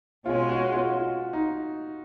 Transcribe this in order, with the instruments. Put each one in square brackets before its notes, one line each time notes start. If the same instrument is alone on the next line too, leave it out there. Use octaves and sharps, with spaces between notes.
[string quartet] B2 G#3 C#4 [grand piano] F4
[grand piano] F#4
F4
F4
D#4